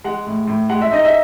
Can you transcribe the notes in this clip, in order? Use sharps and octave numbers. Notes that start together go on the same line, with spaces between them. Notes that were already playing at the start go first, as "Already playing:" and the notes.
G#3 F#5
A2
A2
G#3 F#5
E5
D#4 D#5
E5